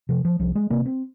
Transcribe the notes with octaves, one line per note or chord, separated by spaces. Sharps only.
C3 F3
F3
C2 F3
G#3
C3 A#3
C4